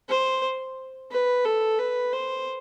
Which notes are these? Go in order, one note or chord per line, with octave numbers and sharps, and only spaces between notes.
C5
B4
A4
B4
C5